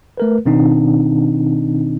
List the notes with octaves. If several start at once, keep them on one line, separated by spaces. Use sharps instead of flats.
A3 A#4 B4
B2 D#3 C4 D4 D#4